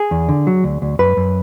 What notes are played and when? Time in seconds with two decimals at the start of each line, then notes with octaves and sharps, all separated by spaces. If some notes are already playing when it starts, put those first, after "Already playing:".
Already playing: G#4
0.11 E2
0.29 D3
0.47 F#3
0.64 D2
0.82 D2
0.99 F#2 B4
1.17 F#2